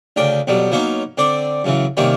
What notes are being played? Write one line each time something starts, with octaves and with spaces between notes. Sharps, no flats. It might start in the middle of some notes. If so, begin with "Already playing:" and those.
D2 C#3 D4 G5
F2 B2 F#3 G3
F#3 A#3 B3 C#4 D#4
D3 C4 D4 D5
F#2 C#3 E3
C3 D#3 G3 A#3 C#4